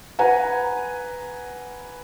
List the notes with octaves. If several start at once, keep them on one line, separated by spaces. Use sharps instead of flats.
B4 F#5 G#5 A#5